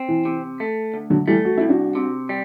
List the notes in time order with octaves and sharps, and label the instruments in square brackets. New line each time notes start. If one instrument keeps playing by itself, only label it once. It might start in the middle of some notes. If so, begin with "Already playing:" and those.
Already playing: [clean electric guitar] C4
[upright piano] E3
[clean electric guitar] C3
A3
D2
[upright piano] D3 F#3
[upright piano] E3 G3 [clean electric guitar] A3
[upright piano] F#4
[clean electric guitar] C2 [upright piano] E4
[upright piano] D4 F#4
[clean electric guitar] C3
G3